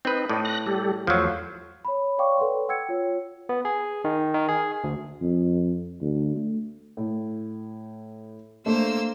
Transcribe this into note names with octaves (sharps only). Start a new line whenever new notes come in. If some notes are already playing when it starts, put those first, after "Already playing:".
C4 D#4 B4
A2 D5 D#5
F#6 A#6
G3 G4 A4
E2 F3 F#3 A3 C5
C#5 B5
C#5 D5 F5 G5 C#6 D6
A4 B4 C#5 F#5 C6
F#5 G5 E6 G#6 C#7
F4 C#5
B3
G#4
D#3
D#3
G#4
D2
F2
D2
A3
A2
A3 A#3 D4 C5 E6